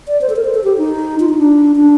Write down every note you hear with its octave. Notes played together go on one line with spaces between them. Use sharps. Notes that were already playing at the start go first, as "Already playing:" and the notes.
D5
C5
A4
A#4
C5
A4
G4
D#4
F4
D#4
D4
D4